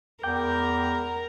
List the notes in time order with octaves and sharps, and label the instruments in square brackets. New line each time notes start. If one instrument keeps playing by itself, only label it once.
[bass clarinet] E2 [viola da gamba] A#4 [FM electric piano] G5 D6 G6